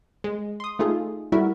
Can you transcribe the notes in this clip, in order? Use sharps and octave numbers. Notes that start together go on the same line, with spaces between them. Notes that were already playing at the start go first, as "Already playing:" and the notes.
G#3
C6 D#6
A3 D#4 F4 G#4 A4
G3 A3 E4 F#4 A#4 E5